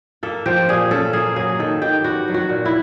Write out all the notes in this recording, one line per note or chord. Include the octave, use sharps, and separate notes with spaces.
A#3 A4
F3 G4
A#2 G#4
C#4 A4
A#3 G#4
F#3 G#4
D#3 A4
D#3 G4
B3 F#4
F#3
F#4
A#2
E4